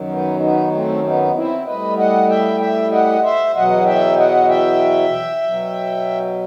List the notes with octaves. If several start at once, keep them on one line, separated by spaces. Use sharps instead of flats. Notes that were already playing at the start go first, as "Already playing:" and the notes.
Already playing: F#2 D#3 F#3
B3 D#4
B3 D#4
A3 C4
B3 D#4
C4 E4
A2 G3 B4 D#5
D#5 F#5
E5 G5
E5 G5
D#5 F#5
C5 E5
E2 B2 F#3 D#5 F#5
E5 G5
D#5 F#5
E5 G5
B2 F#3